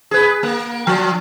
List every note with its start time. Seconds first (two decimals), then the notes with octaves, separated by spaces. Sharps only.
0.11 G#4 B4
0.43 A#3
0.87 F3